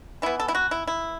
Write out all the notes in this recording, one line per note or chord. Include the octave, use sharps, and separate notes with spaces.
E3 B3 E4
A4
E4
F#4
E4
E4